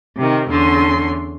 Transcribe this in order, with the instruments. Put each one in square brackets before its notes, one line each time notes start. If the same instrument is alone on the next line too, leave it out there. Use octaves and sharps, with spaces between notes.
[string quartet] C3 D#3
E2 D3 C#4 C6